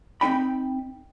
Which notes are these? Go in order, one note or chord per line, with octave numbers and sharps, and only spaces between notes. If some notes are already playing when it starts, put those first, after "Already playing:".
C4 D4 D#4 G5 B5